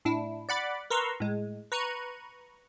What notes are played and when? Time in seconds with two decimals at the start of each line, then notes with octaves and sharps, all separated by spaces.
0.05 A2 D4 E4
0.49 D5 F#5 B5 D6
0.90 A#4 B4 A#5 C6 C#6 E6
1.20 A2 G#3
1.72 B4 A#5 C#6 F#6 D#7